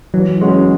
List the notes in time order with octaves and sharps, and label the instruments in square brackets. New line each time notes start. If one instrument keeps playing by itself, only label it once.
[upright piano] E3 [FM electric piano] F#3
[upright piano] G#3 C#4 F#4